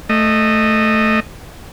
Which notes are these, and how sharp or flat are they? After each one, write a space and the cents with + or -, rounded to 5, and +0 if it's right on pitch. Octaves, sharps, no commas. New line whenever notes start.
A3 +0 D#5 -15